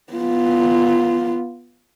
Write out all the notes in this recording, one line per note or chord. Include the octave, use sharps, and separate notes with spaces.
B3 F4